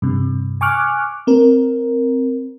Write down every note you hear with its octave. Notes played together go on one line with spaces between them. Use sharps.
G2 C3
G#5 C#6 D6 F6 F#6
C4 A#4